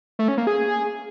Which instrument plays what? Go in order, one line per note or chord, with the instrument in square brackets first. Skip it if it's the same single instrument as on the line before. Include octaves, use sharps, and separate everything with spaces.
[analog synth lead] A3
C#4
A#3
G#4